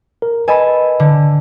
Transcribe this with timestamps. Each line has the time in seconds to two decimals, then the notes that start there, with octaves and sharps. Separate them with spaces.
0.22 A#4
0.48 A4 B4 D#5 G#5 B5
1.00 D3